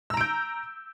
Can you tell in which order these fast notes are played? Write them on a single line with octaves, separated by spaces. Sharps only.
E6 A#5 D7 G6